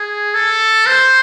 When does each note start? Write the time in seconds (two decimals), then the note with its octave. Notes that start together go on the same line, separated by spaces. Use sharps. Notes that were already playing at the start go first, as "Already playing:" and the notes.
Already playing: G#4
0.34 A4
0.86 C5